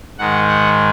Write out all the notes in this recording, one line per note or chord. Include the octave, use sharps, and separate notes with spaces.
G#2 D#3 G#3 F#5
F#5